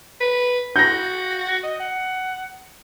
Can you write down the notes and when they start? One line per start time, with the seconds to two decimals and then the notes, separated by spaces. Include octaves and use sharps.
0.20 B4
0.76 F#4 G6 A#6
1.63 D#5
1.80 F#5